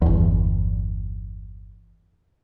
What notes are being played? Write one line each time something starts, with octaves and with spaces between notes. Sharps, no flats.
G1 E2